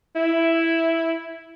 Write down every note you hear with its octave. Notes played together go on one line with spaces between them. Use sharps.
E4